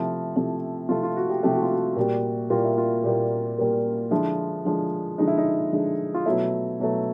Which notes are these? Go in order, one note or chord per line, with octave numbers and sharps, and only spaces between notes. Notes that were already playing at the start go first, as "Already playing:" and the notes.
Already playing: C3 F3 A3 E4
C3 F3 A3
C3 F3 A3 F4
F4
F#4
G4
C3 F3 A3 G4
F#4
F4
F#4
A#2 G3 A#3
A#2 G3 A#3 F4
E4
F4
A#2 G3 A#3
A#2 G3 A#3
D3 F3 G#3 E4
D3 F3 G#3
D3 F3 G#3 D#4
E4
D#4
D3 F3 G#3
F4
B2 F#3 A3 E4
B2 F#3 A3